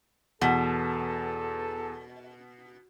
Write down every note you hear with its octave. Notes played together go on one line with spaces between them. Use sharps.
E2 B2 A4 F#5